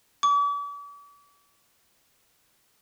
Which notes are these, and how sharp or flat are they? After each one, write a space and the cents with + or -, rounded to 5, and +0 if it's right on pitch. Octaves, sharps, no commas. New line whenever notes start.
D6 -45